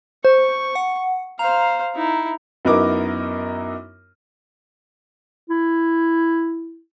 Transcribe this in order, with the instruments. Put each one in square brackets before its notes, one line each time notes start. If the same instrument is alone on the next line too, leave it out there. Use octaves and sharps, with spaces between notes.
[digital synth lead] C5 [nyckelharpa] C#6
[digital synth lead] F#5
[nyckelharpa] C5 F5 [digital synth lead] A#5
[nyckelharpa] D#4 E4
[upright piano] F#2 B3 D#4 E4 A#4 D6
[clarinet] E4